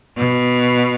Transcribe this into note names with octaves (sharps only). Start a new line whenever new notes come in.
B2